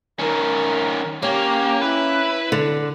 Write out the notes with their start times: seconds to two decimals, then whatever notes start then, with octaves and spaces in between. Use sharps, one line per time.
0.19 D#3 C#4 A#4
1.22 A#3 C#4 G4 C#5
1.82 E4 B4
2.52 D3